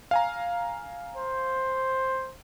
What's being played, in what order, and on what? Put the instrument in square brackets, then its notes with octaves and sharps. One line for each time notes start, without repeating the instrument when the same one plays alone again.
[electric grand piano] F5 G#5 A#5
[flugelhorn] C5